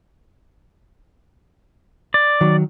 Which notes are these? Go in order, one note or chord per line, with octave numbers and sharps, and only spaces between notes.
D5
D#3 F#3